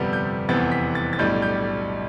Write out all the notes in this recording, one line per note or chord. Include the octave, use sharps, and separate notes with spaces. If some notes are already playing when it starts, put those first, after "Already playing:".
Already playing: G1 F2 C3 G3 B3
G6
F1 E2 C3 E3 B3 A6
B6
A6
A6
B1 A2 G3 D4 G6
G6